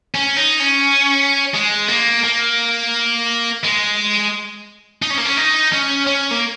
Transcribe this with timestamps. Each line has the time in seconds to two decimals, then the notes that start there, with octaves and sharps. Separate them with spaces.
0.15 C#4
0.37 D#4
0.60 C#4
1.54 G#3
1.88 A#3
2.24 A#3
3.64 G#3
5.02 D#4
5.10 C#4
5.18 A#3
5.26 C#4
5.37 D#4
5.73 C#4
6.07 C#4
6.31 A#3